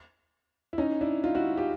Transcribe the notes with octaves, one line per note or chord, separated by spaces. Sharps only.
E4
C#4 D#4
D4 E4
D#4 F4
E4 F#4
F4 G4